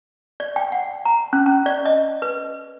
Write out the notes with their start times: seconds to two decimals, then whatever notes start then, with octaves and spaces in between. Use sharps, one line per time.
0.40 D5
0.56 G5
0.72 F#5
1.05 A#5
1.33 C#4
1.46 C#4
1.66 D5
1.86 D#5
2.22 B4